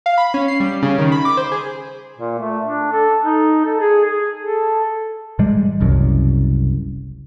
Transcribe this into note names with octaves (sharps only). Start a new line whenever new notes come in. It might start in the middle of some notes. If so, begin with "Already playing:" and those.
F5
B5
C#4
C7
G3
C#3
D#3
B5
D6
C5
G#4
A#2
A3
D4
A4
D#4
A4
G#4
G#4
A4
A2 E3 G3 G#3
F#1 C2 F#2